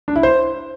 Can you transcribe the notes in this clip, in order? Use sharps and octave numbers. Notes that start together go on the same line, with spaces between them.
D4
E4
C5